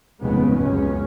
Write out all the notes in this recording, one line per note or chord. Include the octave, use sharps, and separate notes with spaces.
F1 D#2 G#2 C#3 G#3 B3
C#2 F#2 C#4